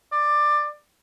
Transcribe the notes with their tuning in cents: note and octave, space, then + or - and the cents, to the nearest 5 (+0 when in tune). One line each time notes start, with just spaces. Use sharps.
D5 +15